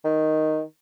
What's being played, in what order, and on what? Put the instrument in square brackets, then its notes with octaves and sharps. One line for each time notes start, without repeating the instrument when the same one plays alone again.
[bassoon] D#3